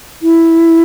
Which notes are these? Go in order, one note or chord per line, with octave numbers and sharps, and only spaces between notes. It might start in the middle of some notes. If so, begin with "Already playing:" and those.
E4